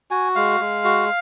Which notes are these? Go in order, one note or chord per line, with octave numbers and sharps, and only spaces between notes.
F#4 G#5
G#3 F5
G#3
F#4